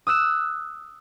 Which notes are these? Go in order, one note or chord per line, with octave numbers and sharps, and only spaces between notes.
D#6 E6 F#6 E7